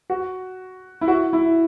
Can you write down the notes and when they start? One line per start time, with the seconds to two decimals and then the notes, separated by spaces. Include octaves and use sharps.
0.10 F#4
1.01 E4
1.08 F#4
1.33 E4